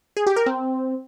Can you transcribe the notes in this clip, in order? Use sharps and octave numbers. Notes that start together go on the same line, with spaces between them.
G#4
G4
A#4
C4